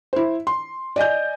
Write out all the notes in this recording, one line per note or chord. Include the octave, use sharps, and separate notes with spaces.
E4 C5
C6
D5 D#5 G#5 G6